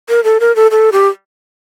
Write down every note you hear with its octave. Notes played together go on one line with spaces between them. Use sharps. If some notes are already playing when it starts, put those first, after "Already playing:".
A#4
A4
A#4
A4
A4
G4